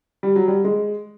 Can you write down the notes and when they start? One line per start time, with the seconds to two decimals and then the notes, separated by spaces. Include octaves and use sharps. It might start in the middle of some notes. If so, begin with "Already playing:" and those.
0.23 G3
0.36 F#3
0.48 G3
0.64 G#3